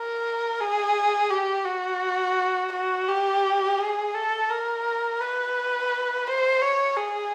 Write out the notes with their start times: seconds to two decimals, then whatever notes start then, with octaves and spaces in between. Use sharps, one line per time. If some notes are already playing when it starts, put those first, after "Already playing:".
Already playing: A#4
0.60 G#4
1.30 G4
1.65 F#4
2.73 F#4
3.08 G4
3.78 G#4
4.15 A4
4.50 A#4
5.20 B4
6.27 C5
6.62 C#5
6.97 G#4